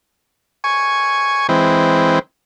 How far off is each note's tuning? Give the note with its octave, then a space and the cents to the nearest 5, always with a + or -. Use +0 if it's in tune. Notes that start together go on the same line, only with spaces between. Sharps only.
G#5 +0 C#6 +0
E3 +0 G#3 +0 C4 +0